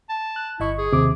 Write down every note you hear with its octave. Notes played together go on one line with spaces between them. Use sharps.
A5
F#6
G1 E4 D#5 C#6
G#4
D#2 C3 D6